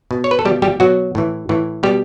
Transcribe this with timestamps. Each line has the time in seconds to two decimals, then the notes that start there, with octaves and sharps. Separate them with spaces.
0.11 B2
0.24 C#5
0.31 B4
0.39 A4
0.45 B2 G3 G4
0.62 G3 G4
0.80 B2 F#3 F#4
1.15 A2 E3
1.49 A2 E3
1.83 B2 G3 G4